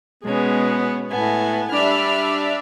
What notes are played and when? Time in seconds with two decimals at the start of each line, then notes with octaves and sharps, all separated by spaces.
0.23 B2 G#3 B3 C#4
1.11 A2 B3 G#5 A5
1.72 G3 D4 D5 E5 B5 F6